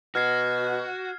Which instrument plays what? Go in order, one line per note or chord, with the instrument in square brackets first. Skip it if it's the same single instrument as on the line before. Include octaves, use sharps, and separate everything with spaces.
[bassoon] B2 [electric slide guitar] F#4 [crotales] F6 G#6 C7